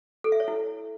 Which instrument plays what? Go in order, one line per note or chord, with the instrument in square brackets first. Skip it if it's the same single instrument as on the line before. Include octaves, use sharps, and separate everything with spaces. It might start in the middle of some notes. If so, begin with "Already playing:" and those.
[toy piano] A4
E5
C#5
E4